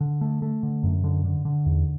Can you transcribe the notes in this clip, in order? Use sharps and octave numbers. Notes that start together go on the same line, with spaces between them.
D3
A3
A3
D3
F#2
D3
D3
D3
E2